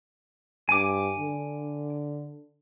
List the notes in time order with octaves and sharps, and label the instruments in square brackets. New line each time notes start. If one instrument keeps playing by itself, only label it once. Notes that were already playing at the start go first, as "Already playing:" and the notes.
[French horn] G2 [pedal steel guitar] G#5 D6
[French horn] D3